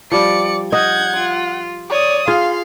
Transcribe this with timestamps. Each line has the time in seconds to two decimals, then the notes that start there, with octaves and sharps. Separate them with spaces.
0.12 F3 G3 D5 C#7
0.72 D#5 F#5 G6 G#6
1.17 F4
1.90 C#5 D5 D#6
2.27 F4 G#4 F5 C6